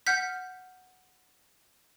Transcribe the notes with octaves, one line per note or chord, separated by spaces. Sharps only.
F#5 F6 G6 B6